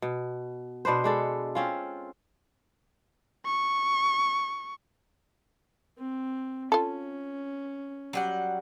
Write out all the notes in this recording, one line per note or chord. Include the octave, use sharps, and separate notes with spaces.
B2
B2 D4 B4 C5
G#3 D4 A4
C4 C#4 F4
C#6
C4
C#4 F4 A4
F#3 G3 F#5